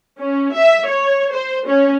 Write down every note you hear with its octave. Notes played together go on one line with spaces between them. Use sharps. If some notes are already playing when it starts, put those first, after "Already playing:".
C#4
E5
C#5
C5
C#4